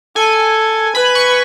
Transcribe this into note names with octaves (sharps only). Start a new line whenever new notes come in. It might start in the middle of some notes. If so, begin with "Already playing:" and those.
A4 G#5
B4 B5
C#6